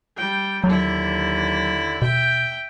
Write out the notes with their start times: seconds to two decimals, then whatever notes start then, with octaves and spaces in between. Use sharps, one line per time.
0.16 G3 G5
0.64 D#2 D3 F#3 E4
2.02 B2 E5 G5